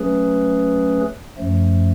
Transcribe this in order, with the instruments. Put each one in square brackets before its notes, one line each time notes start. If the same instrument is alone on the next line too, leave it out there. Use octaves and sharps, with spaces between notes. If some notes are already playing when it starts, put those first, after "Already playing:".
Already playing: [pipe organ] F#3 A3 C#4 G#4 B4
F#2 F3 A3